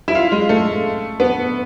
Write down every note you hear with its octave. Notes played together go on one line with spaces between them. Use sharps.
E4
F4
G#3
A3
B3